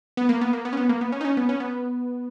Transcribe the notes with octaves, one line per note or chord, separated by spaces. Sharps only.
B3
A#3
B3
A#3
B3
C#4
B3
A#3
B3
C#4
D#4
C#4
B3
C#4
B3